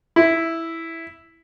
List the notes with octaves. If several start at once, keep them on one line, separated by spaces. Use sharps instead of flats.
E4